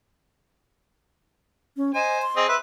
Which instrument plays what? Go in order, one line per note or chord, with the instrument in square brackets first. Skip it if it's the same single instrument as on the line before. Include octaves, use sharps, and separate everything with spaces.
[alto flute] C#4
[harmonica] C5 G#5 [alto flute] D#5
[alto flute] C6
[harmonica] C4 G#4 D#5
B4 E5